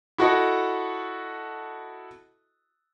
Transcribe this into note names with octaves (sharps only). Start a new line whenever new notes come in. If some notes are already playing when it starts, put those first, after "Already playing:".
E4 F#4 A4 D#5